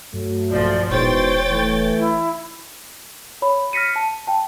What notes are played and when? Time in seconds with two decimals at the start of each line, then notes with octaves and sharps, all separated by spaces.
0.14 G2 F#3 A3
0.50 A#1 F3 D5
0.90 E1 E2 G#2 B2 C5 C#5 G5 A6
1.50 E3 A3
1.98 E4
3.42 C#5 B5
3.73 F6 A#6 B6 C#7 D#7
3.96 A5
4.28 G5 A5